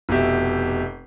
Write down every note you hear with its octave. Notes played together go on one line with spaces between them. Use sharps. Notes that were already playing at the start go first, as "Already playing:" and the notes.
F1 B2 G4 E5